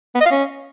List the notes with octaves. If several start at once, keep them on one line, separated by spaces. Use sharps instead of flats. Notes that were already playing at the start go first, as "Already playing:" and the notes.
B3
D#5
F5
C#4